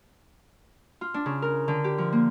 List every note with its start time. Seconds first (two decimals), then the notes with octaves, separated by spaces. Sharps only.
1.01 F4
1.14 D4
1.26 C#3
1.42 A#4
1.68 D3
1.84 G4
1.98 F3
2.12 A#3